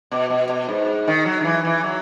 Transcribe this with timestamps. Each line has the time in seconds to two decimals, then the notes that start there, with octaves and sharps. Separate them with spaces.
0.11 B2
0.30 B2
0.49 B2
0.69 G#2
1.08 D#3
1.25 F#3
1.41 D#3
1.45 E3
1.65 E3
1.84 F#3